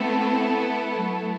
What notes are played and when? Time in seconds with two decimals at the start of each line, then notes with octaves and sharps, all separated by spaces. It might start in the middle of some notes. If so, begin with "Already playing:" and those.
Already playing: A3 B3 C4 E4 A4
0.94 F#3 A3